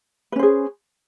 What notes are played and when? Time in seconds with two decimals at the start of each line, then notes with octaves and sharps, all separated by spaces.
0.32 B4
0.36 C#4
0.39 C5
0.43 G#4